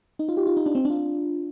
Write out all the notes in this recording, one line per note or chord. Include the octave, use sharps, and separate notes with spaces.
D#4
F4
G4
F4
D#4
D4
C4
D4
F4